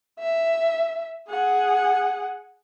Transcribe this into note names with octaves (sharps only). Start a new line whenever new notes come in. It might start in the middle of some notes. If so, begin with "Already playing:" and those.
E5
G#4 F#5